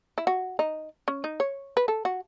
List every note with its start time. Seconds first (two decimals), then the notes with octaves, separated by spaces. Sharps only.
0.18 E4
0.27 F#4
0.59 D#4
1.08 C#4
1.24 D#4
1.40 C#5
1.77 B4
1.88 A4
2.05 F#4